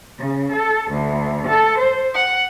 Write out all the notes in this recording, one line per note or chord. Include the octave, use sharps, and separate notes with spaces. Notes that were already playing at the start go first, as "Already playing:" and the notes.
C#3
A4
D2
A4
C5
F#5